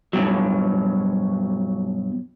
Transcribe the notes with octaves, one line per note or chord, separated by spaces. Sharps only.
G2 B2 F#3